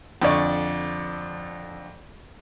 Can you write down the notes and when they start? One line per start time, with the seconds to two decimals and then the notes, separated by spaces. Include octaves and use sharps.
0.22 F2 D3 D5 C#6